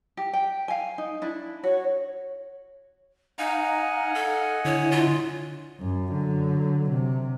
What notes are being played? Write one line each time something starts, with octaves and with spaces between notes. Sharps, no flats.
G4
G5
F5 G#5
D#4
D4 E4
F#4 C#5
D#4 D#5 F5 F#5 G#5
A4
D3 E4 C#5
F4
F#2
D3 F#3
C3